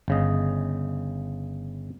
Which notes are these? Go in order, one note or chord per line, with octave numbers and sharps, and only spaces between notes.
G1 C#3 D#5